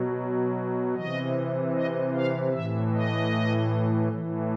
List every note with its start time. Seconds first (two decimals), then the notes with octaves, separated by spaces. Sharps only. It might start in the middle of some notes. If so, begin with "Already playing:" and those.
Already playing: B2 F#3
0.95 C3 E3 D#5
1.74 D#5
2.14 F5
2.53 A2 E3 E5
2.93 D#5
4.12 A2 E3